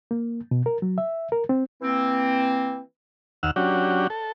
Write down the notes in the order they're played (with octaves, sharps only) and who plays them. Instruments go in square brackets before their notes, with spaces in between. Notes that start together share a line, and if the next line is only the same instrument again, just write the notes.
[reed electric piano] A#3
B2
A#4
F#3
E5
A#4
C4
[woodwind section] E3 A#3 C4
[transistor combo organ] D#2 F#5 E6 F6
F#3 C#4 D4 F#4 G4
A4